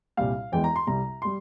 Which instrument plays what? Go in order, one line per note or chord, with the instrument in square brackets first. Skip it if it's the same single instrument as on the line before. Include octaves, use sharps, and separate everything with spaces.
[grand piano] C2 A#2 G3 F5
E2 E3 G#3 G5
A#5
C6
C2 C3 G3 A#5
G3 C6